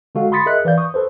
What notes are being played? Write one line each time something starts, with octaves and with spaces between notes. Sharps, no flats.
D3 G#3 F#4 A4 F5
B5 C6 D#6 A6 B6 C#7
G#4 A#4 D#5 E5 F#6
E3 B4 D5 F5 G6
C#6 D#6
A4 B4 C5